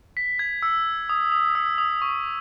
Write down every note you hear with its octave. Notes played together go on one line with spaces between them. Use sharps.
B6
G#6
E6
D#6
D#6
E6
D#6
C#6